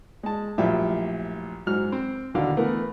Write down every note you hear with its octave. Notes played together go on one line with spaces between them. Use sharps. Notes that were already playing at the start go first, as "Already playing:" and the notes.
G#3 A5
A#1 F#2 A2 F4 G4 E5
G#2 F#3 F6
C4
D#2 B2 D3 F5
E3 A3 B3 A#4